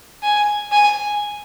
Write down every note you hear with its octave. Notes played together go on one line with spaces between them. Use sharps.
G#5
G#5